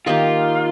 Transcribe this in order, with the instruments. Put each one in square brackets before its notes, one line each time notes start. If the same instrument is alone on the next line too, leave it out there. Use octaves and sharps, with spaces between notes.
[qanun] D#3 A#3 D#4 G4 [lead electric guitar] F4